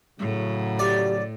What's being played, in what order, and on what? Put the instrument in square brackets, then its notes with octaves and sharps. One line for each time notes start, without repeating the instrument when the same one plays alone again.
[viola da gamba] A2 [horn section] C#3 F#3
[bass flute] G4 [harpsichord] D5